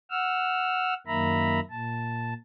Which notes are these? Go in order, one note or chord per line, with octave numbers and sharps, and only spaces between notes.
F#5 E6 F6
F#2 D#3 A#3 E5 A#5 B5
A#2 A5